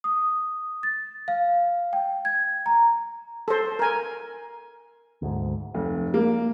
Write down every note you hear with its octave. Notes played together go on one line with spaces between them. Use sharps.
D#6
A6
F5
G5
G#6
A#5
A4 C5
A#4 G#5
D2 G#2
F1
A#3